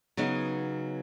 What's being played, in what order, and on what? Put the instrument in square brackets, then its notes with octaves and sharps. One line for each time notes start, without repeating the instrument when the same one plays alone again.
[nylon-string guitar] C#3 F#3 B3 D#4